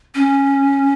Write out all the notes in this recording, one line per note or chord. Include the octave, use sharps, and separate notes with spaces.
C#4